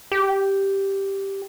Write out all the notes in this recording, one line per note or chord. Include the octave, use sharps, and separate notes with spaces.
G4